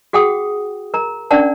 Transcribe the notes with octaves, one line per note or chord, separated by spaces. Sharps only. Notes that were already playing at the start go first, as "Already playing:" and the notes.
F#4 G#4 F#5 G5 D#6
A#4 A#5
C#4 D4 A#4 D5 F#5 A5